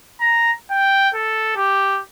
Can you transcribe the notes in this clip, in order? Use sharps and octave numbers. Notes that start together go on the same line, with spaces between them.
A#5
G5
A4
G4